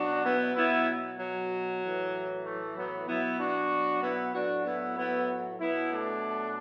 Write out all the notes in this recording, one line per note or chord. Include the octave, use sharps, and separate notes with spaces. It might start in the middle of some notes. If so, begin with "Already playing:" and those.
Already playing: B2 F#3 D4 F#4
B3 E4
B2 F#3 B3 E4
F#3
A2 E3
A3
F#3 B3
B2 F#3 B3 E4
D4 F#4
B3 E4
A2 F#3 D4 F#4
B3 E4
B3 E4
B2 F#3 B3 E4
A3 D4